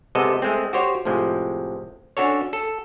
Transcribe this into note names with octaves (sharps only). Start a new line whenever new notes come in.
C3 G#3 B3 A4 D#5
G#3 A3 C4
F#4 G4 C5 C#5
A2 C3 F3 G#3
C#4 D4 F#4 A4 C#5
A4